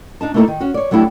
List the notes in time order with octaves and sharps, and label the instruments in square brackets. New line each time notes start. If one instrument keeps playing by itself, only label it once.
[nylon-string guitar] D4 D#4 A5
A3 A#3 D#4 E4 A4 A#4
D#3
C#4 F#4
C#5 D5
F#3 A3 D4 E4 G4